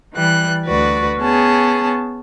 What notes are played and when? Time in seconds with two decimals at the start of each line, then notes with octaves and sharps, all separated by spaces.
0.14 E3 G3 F#6
0.66 D2 F#4 B4 D5
1.18 B3 C#4 G#4 A5